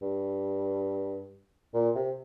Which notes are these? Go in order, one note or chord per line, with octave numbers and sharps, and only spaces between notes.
G2
A#2
C3